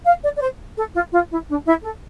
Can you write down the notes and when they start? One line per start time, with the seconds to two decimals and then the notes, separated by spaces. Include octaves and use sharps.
0.05 F5
0.23 D5
0.37 D5
0.41 C5
0.77 A4
0.94 F4
1.13 F4
1.31 E4
1.49 D4
1.66 E4
1.83 A4